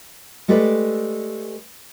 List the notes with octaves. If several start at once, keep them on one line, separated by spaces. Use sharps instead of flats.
G#3 A3 G4 A4 B4 D5